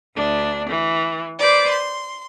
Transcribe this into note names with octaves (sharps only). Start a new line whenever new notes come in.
D2 D4
E3
B4 C5 D5 D6
C6